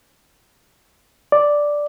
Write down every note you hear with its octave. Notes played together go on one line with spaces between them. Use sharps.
D5